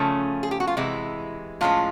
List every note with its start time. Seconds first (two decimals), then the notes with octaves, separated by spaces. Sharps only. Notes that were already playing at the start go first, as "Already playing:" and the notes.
Already playing: C#3 F3 A3 C#4
0.43 G#4
0.51 G4
0.60 F#4
0.67 F4
0.77 C3 E3 G#3 E4
1.61 A2 F3 G#3 C#4 F4